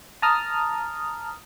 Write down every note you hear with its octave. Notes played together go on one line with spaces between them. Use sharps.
A5 A#5 D#6 F6